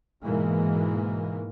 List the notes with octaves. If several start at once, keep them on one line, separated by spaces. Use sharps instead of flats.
G#2 B2 E3 G#3 A#3